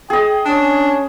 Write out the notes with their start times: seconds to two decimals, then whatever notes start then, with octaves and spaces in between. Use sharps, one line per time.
0.10 G#4 D#5 G5
0.45 C#4 D4